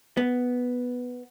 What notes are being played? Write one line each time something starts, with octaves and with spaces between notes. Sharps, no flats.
B3